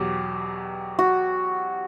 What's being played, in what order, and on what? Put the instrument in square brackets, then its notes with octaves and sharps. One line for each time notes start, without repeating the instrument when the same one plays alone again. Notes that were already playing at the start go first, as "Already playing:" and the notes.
Already playing: [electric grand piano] E2 B2 F#3 [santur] G4
[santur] F#4